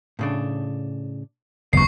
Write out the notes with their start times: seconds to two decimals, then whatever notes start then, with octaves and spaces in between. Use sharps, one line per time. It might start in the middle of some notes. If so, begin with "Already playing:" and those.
0.19 A2 C#3 D4
1.73 F#1 D#2 B3 C#6 C7